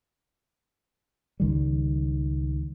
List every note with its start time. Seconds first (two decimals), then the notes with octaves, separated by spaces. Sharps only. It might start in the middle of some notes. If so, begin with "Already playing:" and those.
1.40 C#2 D#3 G3